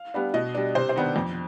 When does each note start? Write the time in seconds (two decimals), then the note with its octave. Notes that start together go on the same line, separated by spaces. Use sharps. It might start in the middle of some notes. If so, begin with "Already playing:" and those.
Already playing: F5
0.14 G3 B3 D4
0.34 B2 D#5
0.54 G3 D4
0.75 C3 C5
0.89 C5
0.96 D#3 B3 D4
1.16 F2